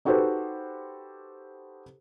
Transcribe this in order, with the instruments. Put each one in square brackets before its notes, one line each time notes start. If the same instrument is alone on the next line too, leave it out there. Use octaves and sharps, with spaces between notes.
[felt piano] D#4 F#4 G4 A4 B4 C5